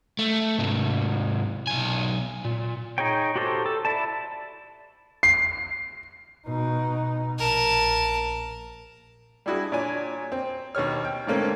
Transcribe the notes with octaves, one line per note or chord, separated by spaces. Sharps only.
A3
G#2 C3
B1 G#5
A#2
D#4 G#4 C#5 G5
F#4 G4 A4 C5
A4
E4 D5 A5
C7
B2 D#4
A#1 A#4 A5
G3 D4 E4 F#4 G#4
A#2 D4 C#5 G#5
C4
D#2 B2 G4 C#5 F6
G5
G#2 D3 A3 A#3 C4 C#4